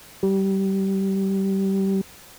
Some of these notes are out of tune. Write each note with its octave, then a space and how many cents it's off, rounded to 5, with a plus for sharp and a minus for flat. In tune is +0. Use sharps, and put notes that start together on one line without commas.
G3 -20